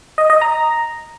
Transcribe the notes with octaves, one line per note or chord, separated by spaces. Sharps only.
D#5
D#5
A#5